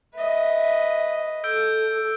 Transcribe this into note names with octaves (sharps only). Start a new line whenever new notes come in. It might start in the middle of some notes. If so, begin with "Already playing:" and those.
B4 D#5 E5
A4 E6 G6 D7